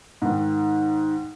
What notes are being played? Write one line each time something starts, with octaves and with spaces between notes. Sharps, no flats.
G#2 D#3